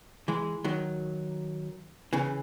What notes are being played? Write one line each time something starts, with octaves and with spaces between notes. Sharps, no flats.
E3 G#3
D#3 F#3
C#3 E3